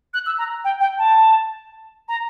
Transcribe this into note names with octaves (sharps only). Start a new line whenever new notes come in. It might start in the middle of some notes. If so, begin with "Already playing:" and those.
F#6
E6
A#5
G5
G5
A5
A#5